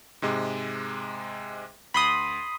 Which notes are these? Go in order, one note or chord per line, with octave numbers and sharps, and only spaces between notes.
G#2 C3 G#3
D2 B5 C6 D#6